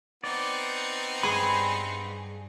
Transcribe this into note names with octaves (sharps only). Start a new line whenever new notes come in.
B3 C4 D#4 D5
G2 G#4 B5 C6